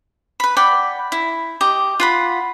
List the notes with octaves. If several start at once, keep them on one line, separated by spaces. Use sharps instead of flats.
B4 B5
D5 F#5 G5 B5
E4
G4 D#5
F4 F#5 B5